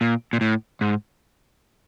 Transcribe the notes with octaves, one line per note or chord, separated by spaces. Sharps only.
A#2
A#2
A2
G#2